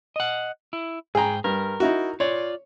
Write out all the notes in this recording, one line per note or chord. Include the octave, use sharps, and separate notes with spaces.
D#5 F#5
E4
G#2 G#4 G5 A#5
G2 A#4
D#4 E4 F#4
F4 C#5 D5